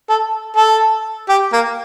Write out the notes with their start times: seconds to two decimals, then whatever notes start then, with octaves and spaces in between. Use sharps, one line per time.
0.09 A4
0.57 A4
1.29 G4
1.53 A#3